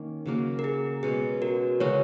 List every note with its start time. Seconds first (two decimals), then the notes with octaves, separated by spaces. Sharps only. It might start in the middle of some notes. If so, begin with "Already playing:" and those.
Already playing: D#3 A#3 C#4
0.26 C#3 F#3 A#3
0.59 A#4
0.64 G#4
1.03 B2 G#3 C#4 G#4
1.42 F#4 A#4
1.80 C#3 G#3 C#4 F#4 A#4 C#5